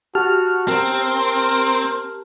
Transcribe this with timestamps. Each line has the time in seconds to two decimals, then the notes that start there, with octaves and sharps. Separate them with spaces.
0.15 F#4 G4 A5 F6
0.68 C4 A#4